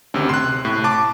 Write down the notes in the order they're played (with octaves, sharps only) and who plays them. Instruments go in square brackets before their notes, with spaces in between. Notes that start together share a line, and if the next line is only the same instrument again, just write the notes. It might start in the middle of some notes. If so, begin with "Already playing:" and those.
[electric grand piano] D2 C3 D#3 [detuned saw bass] C#4
[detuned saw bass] C3 [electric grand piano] C6 F#6
[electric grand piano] A2
A5 D6